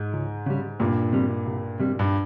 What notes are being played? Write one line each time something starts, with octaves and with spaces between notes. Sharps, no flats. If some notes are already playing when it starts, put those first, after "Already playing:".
Already playing: G#2
C#2
C#3 G3
C2 G2 A#2
C3 G3
C2
C3 G3
G2